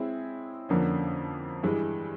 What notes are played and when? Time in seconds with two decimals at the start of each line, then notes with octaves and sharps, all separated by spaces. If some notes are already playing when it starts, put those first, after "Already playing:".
Already playing: G#3 C4 E4 G#4 C#5
0.69 F2 D3 F3 A#3 C#4
1.63 G2 E3 G#3